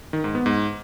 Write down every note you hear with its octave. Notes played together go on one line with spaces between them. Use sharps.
D#3
G#2
B3
G#2